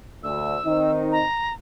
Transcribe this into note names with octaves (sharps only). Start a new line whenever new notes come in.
D2 E6
D#3 C4 D#4
A#5